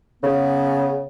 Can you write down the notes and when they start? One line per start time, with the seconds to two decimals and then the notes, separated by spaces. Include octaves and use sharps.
0.23 C#3 B3